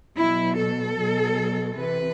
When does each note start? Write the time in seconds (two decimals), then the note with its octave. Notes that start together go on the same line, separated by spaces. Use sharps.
0.16 B2 F#3 E4
0.56 A4
0.96 B2 F#3
1.77 C3 E3 B4